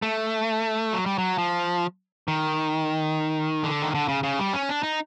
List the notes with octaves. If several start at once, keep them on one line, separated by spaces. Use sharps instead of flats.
A3
F#3
G3
F#3
F3
D#3
D3
D#3
D3
C#3
C#3
G3
C#4
D4
D#4